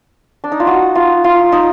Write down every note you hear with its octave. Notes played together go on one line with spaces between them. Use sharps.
D4
D#4
F4
F#4
F4
F4
D#4